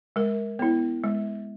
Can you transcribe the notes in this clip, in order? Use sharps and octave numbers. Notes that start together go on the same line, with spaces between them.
G#3 A#4
B3 E4
G#3